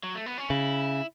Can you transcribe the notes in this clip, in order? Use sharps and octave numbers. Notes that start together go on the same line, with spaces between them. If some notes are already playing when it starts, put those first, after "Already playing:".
F#3
A3
B3
C#4
C#3 E4